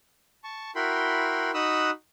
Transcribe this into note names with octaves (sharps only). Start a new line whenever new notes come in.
A5 C#6
E4 F#4 A#4 G5 B5 C6
D#4 F#4 B5 D#6 E6 F#6